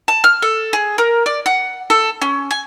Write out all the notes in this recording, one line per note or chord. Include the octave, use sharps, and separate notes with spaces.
A5
F6
A4
G#4
A#4
D5
F#5
A4
C#4
G#5